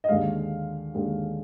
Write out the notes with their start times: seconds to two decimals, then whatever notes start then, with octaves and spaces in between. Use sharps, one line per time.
0.04 D#5
0.09 D#2 D3 G#3 F5
0.94 D#2 D3 G#3